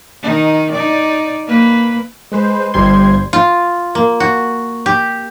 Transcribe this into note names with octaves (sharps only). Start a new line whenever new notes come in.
D#3 D#4
D#4 D5
A#3 B4
G#3 B4 C5
G1 G2 G3 C5 C6 G#6
F4
A#3
F#4
G4